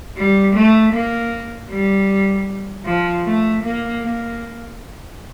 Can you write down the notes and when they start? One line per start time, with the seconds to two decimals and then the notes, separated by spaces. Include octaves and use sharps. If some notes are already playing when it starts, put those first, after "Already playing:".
0.17 G3
0.55 A3
0.93 A#3
1.70 G3
2.85 F3
3.24 A3
3.62 A#3
4.01 A#3